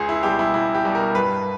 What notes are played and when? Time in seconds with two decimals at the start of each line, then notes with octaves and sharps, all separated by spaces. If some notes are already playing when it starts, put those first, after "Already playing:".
Already playing: C#2 G#4
0.09 E4
0.23 B2 G3 G4
0.39 E4
0.54 C#2 E4
0.75 G4
0.85 B2 G3
0.95 A#4
1.15 G2 B4